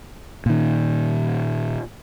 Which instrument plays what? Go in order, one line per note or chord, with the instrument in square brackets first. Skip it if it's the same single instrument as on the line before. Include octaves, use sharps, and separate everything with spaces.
[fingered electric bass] A#2 D#3